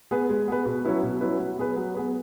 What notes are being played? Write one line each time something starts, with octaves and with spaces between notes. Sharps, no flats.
B3 G#4 B4
G#3
B3 G#4 B4
B2
F#3 C#4 E4 B4
B2
F#3 C#4 E4 B4
F#3
B3 G#4 B4
F#3
B3 G#4 B4